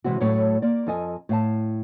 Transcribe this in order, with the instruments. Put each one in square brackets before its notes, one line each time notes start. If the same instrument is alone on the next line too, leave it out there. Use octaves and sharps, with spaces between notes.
[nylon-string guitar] C3 E3 G#3 C4 F#4
A2 F#3 A3 C#5
A#3 D5
F2 F4 A4 D#5 G#5
A2 F5 A5